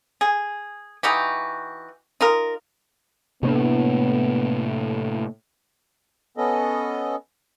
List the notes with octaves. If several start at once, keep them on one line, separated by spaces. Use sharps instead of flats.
G#4
E3 D#4 F#4 G4
D#4 F4 A#4
A2 C3 A#3 B3 D4
B3 C#4 A4 D#5